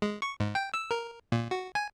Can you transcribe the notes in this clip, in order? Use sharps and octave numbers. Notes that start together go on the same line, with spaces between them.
G#3
C#6
G#2
G5
E6
A#4
A#2
F#4
G#5